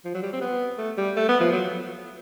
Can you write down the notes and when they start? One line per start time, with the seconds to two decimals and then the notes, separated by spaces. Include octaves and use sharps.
0.04 F3
0.14 F#3
0.22 G3
0.33 C4
0.41 B3
0.78 A3
0.97 G3
1.16 A3
1.29 B3
1.40 F3
1.52 F#3